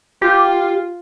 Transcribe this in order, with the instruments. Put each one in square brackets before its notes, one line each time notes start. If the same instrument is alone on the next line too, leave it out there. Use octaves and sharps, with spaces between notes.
[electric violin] F4 [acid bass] G4